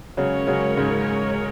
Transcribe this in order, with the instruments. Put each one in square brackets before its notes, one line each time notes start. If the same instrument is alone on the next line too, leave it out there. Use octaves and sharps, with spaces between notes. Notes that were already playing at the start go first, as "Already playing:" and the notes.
[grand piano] C#3 F#3 [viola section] G#3 C#4 A#4 C#5
[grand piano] C#3 F#3
G#2 C#3